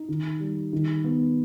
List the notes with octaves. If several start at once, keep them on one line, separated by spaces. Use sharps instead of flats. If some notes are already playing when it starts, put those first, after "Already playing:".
Already playing: D#4
D#3
G3
D#3
B3